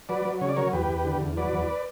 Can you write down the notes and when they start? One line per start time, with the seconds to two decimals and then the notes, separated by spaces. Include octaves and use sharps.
0.09 F#3 B4 D5
0.25 F#3
0.41 C#3 C#5
0.49 D5
0.56 F#3 A#4 C#5
0.73 E2 G4 B4
0.89 E2
1.05 D3
1.21 E2
1.37 F#3 B4 D5
1.53 E2